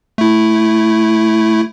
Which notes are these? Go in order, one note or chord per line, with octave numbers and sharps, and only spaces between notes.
A3 E4